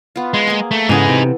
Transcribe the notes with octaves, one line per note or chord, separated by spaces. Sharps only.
B3 F4
G#3
A#3 G#4
A3
G#2 C#3 E3 G#3 B3 D#4 G#4 A4
C3